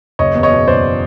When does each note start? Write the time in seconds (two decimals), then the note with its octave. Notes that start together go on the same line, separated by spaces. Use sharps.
0.19 F#1 C#5 D#5
0.35 E2
0.43 C#5 D#5
0.51 B2
0.68 F#1 C5 D5